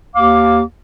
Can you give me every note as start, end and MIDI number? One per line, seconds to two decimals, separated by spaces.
0.16 0.61 39
0.16 0.61 77
0.16 0.61 86